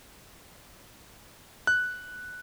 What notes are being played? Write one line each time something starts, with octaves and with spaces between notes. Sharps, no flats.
F#6